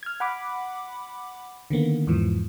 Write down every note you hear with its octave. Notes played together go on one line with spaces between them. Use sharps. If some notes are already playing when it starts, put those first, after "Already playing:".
F6 G#6
F#5 B5 D6
D3 D#3 A#3 B3
E2 G#2 E3 F3